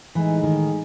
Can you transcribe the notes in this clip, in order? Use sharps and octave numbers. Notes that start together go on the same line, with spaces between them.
A2 E3 G#3 D#4 G#4
D#3